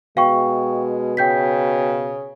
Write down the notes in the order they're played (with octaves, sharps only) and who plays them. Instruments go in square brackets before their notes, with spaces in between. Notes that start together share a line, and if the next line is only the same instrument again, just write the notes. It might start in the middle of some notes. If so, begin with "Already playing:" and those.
[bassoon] B2 [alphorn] G#3 [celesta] F5 G5 C#6
[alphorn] C#3 [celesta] G5 G6 B6